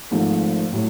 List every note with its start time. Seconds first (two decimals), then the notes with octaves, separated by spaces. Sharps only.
0.11 G#1 G#2 F3 A3
0.73 A2 F#3